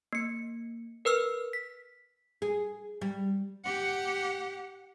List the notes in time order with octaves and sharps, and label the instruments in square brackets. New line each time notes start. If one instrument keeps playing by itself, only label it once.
[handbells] A#3 C#7
A#4 B4 E6 F6
B6
[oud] G#4
G3
[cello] G4 F#5